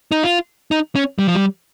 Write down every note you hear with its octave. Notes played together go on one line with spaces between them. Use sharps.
D#4
F4
D#4
C#4
G3
F3
G3